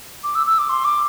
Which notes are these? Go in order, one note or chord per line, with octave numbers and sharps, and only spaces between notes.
D6
E6
E6
D6
C6
D6